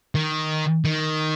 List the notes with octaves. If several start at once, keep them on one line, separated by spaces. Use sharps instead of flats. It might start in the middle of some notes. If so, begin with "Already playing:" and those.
D#3
D#3